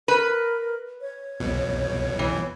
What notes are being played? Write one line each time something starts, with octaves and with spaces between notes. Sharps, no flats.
A#4 B4
C#5
C2 F2 B2
E3